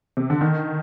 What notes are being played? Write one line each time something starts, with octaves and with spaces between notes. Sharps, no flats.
C3
D3
D#3